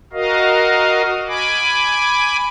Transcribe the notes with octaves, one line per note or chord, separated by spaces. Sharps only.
F#4 A#4 D#5 F5
G#5 B5 D6